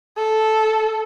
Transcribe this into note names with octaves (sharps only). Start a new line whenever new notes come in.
A4